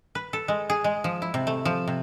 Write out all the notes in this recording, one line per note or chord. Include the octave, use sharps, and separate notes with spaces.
B4
A4
G#3
G#4
G#3
F3
E4
C3
A3
F3
C3